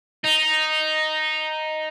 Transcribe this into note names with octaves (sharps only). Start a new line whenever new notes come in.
D#4